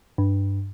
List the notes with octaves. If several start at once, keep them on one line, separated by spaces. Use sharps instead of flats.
G2